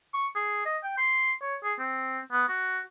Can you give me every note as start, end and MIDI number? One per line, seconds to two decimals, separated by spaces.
0.14 0.27 85
0.36 0.65 68
0.66 0.77 75
0.84 0.93 79
0.98 1.32 84
1.42 1.56 73
1.64 1.74 68
1.79 2.19 60
2.32 2.47 59
2.48 2.81 66